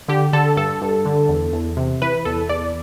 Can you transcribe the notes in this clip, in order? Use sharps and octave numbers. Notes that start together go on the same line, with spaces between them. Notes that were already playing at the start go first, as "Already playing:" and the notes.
D3 G4
D3 A4
G2 A4
G2
D3
E2
E2
C3
E3 B4
E2 A4
E2 D5